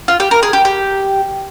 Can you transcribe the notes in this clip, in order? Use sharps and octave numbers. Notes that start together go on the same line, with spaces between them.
F4
G4
A#4
G#4
G4
G4